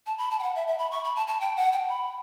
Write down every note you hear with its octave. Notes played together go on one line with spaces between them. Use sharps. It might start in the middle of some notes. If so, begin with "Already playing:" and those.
A5
B5
A5
G5
F#5
E5
E5
B5
C#6
B5
A5
A5
G5
F#5
G5
B5